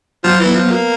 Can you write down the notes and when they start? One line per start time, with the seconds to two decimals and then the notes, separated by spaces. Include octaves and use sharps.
0.24 F3 F#3
0.40 E3
0.45 B3
0.55 F3
0.65 B3
0.71 A#3